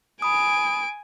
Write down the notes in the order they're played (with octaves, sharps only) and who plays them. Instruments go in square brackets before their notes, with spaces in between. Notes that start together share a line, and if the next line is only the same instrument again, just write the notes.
[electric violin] G#5 D7 [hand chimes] B5 D#6